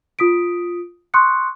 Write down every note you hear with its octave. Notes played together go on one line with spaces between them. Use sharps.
F4 D#6 B6 D7
C6 C#6 D#6 F#6 C#7